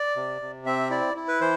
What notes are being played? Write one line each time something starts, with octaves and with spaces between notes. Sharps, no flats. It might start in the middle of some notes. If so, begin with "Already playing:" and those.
Already playing: D5
C3
C3
C4 E5
E4 D5
E4
B4
E3 C5